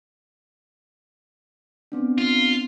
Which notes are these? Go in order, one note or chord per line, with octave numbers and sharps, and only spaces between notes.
B3 C4 D4
F4